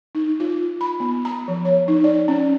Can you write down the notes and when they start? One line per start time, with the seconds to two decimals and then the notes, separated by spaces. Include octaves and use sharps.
0.15 D#4
0.40 F4
0.81 B5
1.00 B3
1.25 A#5
1.48 F3
1.65 C#5
1.88 D#4
2.04 D5
2.28 C#4